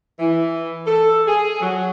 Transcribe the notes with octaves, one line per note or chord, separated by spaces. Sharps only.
E3
A4
G#4
F#3